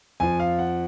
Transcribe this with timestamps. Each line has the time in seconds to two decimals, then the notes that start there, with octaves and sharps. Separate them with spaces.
0.20 F2 F3 G#5
0.40 F5
0.59 F#5